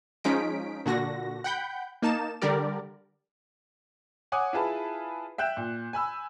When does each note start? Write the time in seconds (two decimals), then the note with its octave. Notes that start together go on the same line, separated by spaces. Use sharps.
0.24 F3 G#3 C#4 D#4 B6 D7
0.86 A#2 D3 F#4 A#6
1.44 F#5 G5 B5 G6
2.02 A#3 D#4 A5 E7
2.42 D3 G3 G4 A#4 D5
4.32 C#5 F#5 G#5 D6 D#6
4.53 E4 F4 G#4 B4 A5
5.38 E5 G5 F#6 G6 E7
5.57 A#2
5.93 G#5 B5 E6